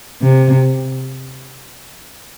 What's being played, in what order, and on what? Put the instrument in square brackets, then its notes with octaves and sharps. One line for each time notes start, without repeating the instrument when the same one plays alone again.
[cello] C3